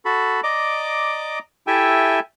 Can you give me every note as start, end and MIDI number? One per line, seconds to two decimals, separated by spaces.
0.05 0.41 66
0.05 0.41 69
0.05 0.41 83
0.44 1.39 74
0.44 1.39 75
0.44 1.39 82
0.44 1.39 86
1.67 2.20 64
1.67 2.20 67
1.67 2.20 69
1.67 2.20 76
1.67 2.20 79
1.67 2.20 80